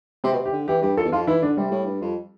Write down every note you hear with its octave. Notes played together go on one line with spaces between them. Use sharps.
C3 C4
B2
C3
G4
D3
E3 G4
G2 G4
F2 A4
E2
F2 F4
E3 E4
D3 D4
C3 G3
A2
G2
F2